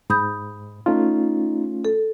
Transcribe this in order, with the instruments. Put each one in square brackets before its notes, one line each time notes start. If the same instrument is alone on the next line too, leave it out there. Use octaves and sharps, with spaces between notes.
[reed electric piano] G#2 [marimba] B5 D#6 G6
[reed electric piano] A3 C#4 F4 [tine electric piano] D#4
[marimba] A4